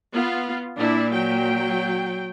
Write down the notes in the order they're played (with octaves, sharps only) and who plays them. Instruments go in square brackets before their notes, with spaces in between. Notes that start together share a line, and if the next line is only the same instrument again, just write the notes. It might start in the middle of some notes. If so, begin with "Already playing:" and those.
[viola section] B3 F4
[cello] A#2 [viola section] D4 E4
[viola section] F#3 G5